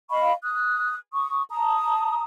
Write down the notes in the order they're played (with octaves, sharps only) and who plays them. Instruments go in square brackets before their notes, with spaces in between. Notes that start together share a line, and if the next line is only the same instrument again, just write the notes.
[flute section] D#5 F5 B5 C#6
D#6 F#6
C#6 D#6
A5 A#5 D#6